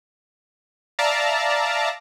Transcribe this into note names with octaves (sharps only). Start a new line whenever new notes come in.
D5 E5 F5 A5 A#5